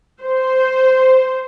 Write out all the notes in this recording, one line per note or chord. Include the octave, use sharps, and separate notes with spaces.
C5